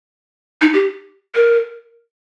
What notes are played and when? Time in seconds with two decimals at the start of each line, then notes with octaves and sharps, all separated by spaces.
0.61 D#4
0.74 G4
1.35 A#4